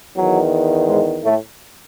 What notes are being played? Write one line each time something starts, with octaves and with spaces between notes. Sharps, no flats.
E2 D#3 F#3
G#2 G#3
A2 A3